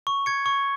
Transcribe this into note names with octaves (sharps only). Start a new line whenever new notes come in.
C#6
G#6 C#7
C#6